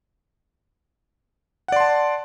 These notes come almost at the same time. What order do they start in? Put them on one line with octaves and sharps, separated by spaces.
F#5 D5 C6 A5